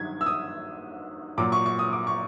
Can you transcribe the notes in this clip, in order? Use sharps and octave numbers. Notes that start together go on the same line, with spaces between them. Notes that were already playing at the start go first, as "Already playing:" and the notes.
Already playing: G2 D#3 F#3 G#6
E6
D#6
A#2 F#3 D6
C#6
C#6
D#6
D6
C#6